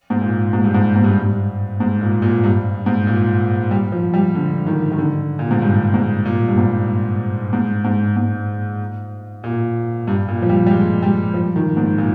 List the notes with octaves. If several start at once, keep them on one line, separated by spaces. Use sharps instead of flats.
G#2
A#2
G#2
G2
G#2
G#2
G2
G2
G#2
A#2
A#2
G2
G#2
A#2
G3
F3
G3
D3
D#3
D#3
D3
A#2
G#2
G2
G#2
A#2
G2
G#2
G#2
G#2
G#2
A#2
G2
A#2
F3
G3
G3
G#3
G3
F3
D#3
G#2
A#2